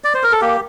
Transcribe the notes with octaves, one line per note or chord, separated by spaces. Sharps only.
D5
C5
A#4
A4
A#3 G4